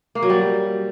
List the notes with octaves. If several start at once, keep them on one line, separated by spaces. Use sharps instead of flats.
A#3
F#3
G3